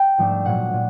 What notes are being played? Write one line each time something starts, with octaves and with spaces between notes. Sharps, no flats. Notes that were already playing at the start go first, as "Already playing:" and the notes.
Already playing: G5
G#2 F3 A3 D4
A#2 F#3 A#3 F#5
A#2